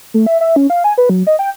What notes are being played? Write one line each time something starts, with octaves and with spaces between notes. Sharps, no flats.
A3
E5
E5
C#4
F5
G#5
B4
F#3
D#5
G5